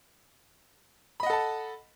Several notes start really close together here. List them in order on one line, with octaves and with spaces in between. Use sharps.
B5 D#5 F#5 A4 A5